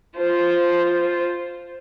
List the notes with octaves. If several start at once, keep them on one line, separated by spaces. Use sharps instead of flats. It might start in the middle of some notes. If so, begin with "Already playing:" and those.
F4 C5